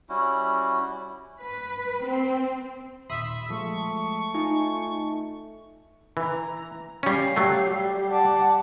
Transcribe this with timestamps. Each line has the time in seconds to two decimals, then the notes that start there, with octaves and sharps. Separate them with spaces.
0.09 G3 C#4 E4 F#4
1.41 B4
2.04 C4
3.10 D#2 A#2 E5 B5 C6 D#6
3.50 F3 G#3 A3 C#6
4.35 D#4 F4 G#5
6.17 E3 A#5
7.03 G3 C#4 F5
7.36 F#3 A3 G4
7.68 G3
8.10 F#5 A5 D6